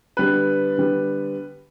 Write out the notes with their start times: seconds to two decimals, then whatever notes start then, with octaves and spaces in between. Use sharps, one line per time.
0.17 D3 G3 B3 B4
0.78 D3 G3 B3